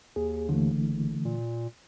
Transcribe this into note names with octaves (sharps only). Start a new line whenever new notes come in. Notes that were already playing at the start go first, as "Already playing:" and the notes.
D#2 G#4
D3 E3 A3
F#1
A#2